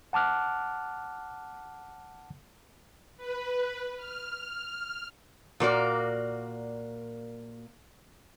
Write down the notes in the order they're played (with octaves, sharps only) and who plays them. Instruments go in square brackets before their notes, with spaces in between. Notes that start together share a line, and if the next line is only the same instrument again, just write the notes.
[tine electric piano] F#5 A5 D6 F6 F#6
[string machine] B4
F6
F6
[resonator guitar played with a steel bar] A#2 A#3 F#4 D5